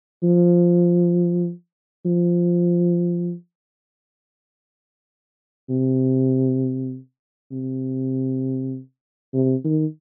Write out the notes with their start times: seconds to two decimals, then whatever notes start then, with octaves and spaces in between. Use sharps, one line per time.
0.23 F3
2.05 F3
5.70 C3
7.52 C3
9.34 C3
9.64 D#3